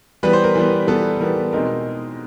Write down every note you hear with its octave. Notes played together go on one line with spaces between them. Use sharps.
E3 G3 B3 B4
C5
A#4
E3 G3 B3
E3 G3 B3 A4
E3 G3 B3 A#4
B2 G#3 C4 D#4 A#4